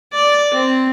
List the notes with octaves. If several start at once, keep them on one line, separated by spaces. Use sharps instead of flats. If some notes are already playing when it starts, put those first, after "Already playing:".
D5
C4